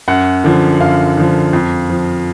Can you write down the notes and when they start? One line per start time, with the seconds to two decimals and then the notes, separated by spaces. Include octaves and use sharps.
0.08 F#2 F#5
0.44 D3 F3
0.80 F#2 F5
1.17 D3 F3
1.53 F2
1.90 F3